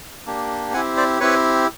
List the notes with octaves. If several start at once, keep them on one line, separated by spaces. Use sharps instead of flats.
A#3 D4 G4
C4 E4 G4 F#5 G#5
C5 D5
C4 E4 G4 B4 C#5